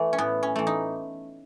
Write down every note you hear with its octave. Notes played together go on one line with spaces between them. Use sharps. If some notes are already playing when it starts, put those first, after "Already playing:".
Already playing: E3 A3
C#4
A2 B3
C#4
E3 A3
D#4